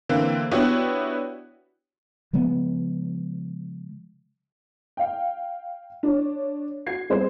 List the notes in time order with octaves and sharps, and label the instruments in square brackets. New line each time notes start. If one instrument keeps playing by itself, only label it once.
[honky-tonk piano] D3 E3 A#3 C4
B3 D4 E4 F#4 G4 C#5
[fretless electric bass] C#3 F3 G#3 B3
[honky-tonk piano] F5 G5
D4 C#5
F#4 F#5 G#6 C7
G3 C4 G#4 C5 C6